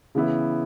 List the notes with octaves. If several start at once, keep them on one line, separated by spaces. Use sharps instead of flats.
C#3 E3 B3 E4